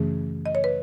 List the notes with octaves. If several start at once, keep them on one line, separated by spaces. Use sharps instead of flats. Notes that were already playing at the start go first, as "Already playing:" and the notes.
Already playing: F#2 C#3 E3 A3 C#4 G#4
D#5
C#5
B4